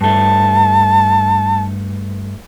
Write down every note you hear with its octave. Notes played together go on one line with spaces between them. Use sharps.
G2 A3 A5